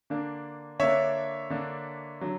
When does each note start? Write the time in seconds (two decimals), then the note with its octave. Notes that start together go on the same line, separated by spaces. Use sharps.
0.10 D3 A#3 D4
0.80 D3 A#3 D4 C#5 E5
1.50 D3 A#3 D4
2.21 D3 F#3